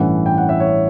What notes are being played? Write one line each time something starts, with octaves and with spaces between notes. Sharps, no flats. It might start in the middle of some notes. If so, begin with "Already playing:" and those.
Already playing: A1 G2 E3 A3 C#4 F#5
G5
F#5
E5
C#5